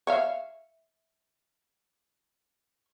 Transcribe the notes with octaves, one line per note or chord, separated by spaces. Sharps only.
C#5 E5 F5